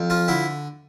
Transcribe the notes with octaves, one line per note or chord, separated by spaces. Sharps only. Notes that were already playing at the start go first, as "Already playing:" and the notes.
Already playing: F2
F3 F4
D3 E4